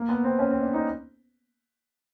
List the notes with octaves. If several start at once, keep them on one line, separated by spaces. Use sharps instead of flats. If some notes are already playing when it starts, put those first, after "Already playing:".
Already playing: A#3
B3
C4
C#4
C4
D4
D#4